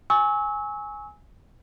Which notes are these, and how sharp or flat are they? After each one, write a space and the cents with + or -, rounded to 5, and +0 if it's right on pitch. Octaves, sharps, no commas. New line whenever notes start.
G#5 +0 C#6 +0 E6 -30